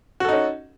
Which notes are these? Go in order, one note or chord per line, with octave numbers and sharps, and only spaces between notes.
C#4 D#4 F#4 A4